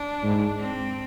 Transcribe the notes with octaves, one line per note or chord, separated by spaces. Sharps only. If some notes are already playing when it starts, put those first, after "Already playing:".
Already playing: D4
G#2
C4